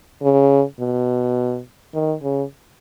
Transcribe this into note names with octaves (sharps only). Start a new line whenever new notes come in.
C#3
B2
D#3
C#3